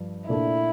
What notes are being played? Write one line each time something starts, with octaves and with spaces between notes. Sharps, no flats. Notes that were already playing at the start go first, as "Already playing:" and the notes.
Already playing: G2 F3
A#2 A3 D4 E4